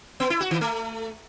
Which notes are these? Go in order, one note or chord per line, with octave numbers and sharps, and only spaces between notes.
B3
E4
F#4
D#3
A3